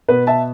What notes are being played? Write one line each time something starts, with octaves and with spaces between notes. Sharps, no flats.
B2 B3 B4
E5 A5